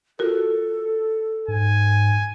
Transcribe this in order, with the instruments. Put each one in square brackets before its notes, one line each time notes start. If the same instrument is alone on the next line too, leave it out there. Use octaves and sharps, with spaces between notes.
[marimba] F4 F#4 A#4 [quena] A4
[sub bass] G#2 [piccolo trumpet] G#5